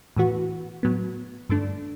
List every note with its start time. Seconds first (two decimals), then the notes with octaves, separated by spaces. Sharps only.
0.16 A2 E3 B3 F#4
0.83 A2 F#3 B3
1.49 G2 D3 A3 D4